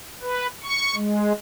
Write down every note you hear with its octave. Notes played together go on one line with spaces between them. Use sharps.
B4
C#6
G#3